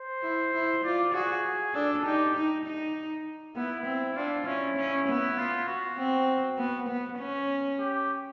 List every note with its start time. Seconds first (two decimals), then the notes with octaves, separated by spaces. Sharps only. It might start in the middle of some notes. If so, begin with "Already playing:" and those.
Already playing: C5
0.23 E4
0.53 E4
0.84 F4 D5
1.14 F#4 G#4
1.74 D4 A4
2.05 D#4 G4
2.35 D#4
2.65 D#4
3.56 B3 E4
3.86 C4
4.16 D4 F4
4.46 C#4 E4
4.78 C#4
5.08 B3
5.38 F4
5.68 F#4
5.98 C4
6.58 B3
6.88 B3
7.19 C#4
7.79 G4